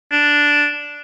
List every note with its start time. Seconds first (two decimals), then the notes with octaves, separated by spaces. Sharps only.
0.12 D4